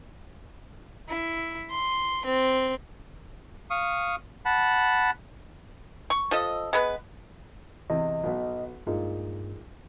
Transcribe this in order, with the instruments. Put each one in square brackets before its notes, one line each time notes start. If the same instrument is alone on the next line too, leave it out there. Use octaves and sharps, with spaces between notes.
[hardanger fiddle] E4
C6
C4
[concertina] F5 C#6 D#6
F#5 A5 B5
[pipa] C#6
F3 A4 D#5
G#3 B3 B4
[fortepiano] E2 C3 [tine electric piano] D#5
[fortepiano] B1 B2
[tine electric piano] G2 [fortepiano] A#2 G#3 D#4